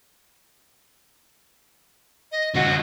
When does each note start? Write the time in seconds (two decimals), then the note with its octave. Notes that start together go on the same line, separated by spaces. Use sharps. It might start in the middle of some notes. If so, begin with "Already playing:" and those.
2.32 D#5
2.55 D3 F4 F#4